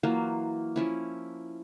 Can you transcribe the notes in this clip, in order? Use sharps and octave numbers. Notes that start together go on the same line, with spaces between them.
E3 F#3 A#3 F4
F3 C#4 E4